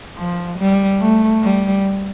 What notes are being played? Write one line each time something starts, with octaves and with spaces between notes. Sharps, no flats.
F3
G3
A3
G3